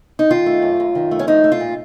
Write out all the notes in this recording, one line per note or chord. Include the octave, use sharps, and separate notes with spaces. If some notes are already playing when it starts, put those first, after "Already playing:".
D#4
D#3 F4
A3
F#2
F#2
D#3
A3
C#4
F3 D#4
A3
F4
A#2